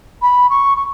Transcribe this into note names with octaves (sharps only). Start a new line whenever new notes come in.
B5
C#6
C#6